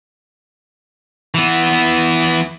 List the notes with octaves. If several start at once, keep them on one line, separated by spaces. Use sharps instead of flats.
E3 B3